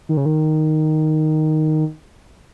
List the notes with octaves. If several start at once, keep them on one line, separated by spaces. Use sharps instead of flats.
D#3
C#3
D#3